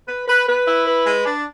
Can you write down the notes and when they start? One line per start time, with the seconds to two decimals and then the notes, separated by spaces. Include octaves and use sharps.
0.08 B4
0.28 B4
0.48 B4
0.67 E4
0.87 B4
1.06 G#3
1.26 D4